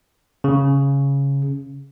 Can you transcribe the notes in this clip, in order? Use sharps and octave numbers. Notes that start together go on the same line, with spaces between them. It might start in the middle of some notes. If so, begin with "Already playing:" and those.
C#3